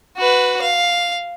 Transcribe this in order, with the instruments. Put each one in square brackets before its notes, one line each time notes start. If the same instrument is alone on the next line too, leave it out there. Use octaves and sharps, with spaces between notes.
[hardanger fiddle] F#4 B4
F5